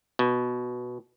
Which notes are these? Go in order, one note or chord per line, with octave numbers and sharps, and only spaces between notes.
B2